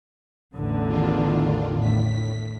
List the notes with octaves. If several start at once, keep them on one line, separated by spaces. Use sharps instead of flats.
A1 E2 D3
D#3 D4 F4
A2 B6